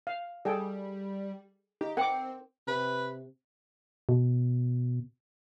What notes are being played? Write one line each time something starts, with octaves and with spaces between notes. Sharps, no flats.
F5
G3 G#4 A4 G5
D#4 G4
C4 A#4 F#5 G5 D6
C3 B4
B2